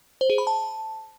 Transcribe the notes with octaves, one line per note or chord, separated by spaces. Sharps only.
C5
G#4
B5
A5